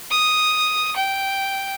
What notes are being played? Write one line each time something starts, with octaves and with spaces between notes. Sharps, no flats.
D#6
G5